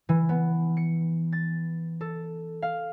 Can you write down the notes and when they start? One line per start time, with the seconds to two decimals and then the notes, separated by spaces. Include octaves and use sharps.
0.09 E3
0.29 B3
0.77 C#7
1.32 A6
2.01 A4
2.62 F5